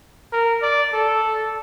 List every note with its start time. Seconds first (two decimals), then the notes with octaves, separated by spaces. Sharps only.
0.33 A#4
0.62 D5
0.93 A4